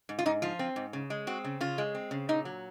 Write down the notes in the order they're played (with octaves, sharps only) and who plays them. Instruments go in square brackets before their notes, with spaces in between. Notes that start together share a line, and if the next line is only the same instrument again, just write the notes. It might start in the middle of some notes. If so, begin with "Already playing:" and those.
[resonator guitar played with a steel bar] G#2
F4
G#2 D#4
F3 F4
C4
G#2
C#3
G#3
C4 F#4
C#3
C#3 F4
G#3
C4
C#3
A#2 D#4
F#3